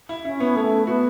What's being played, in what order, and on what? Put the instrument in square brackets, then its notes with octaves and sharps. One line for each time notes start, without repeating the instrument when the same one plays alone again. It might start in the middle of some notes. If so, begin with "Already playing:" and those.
[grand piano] E4
[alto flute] C#4 [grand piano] E4
[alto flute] B3 [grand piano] C#4
[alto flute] A3 [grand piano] E4
[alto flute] B3 [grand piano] F#4